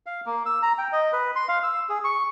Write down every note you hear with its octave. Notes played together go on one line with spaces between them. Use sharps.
F5
A#3
E6
A#5
G5
D#5
B4
C6
F5
E6
G#4
C#6